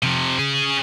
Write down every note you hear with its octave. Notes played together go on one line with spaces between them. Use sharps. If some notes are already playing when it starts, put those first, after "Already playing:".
C3 F3
C#4 G#4